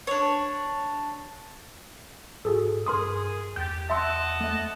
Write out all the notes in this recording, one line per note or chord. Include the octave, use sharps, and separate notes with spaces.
D4 C#5
G#2 F#4 G#4 A4
G2 G#4 A#4 C6 D#6
E2 G4 G6 A6
D#5 E5 F#5 A5 C6 E6
A3 E5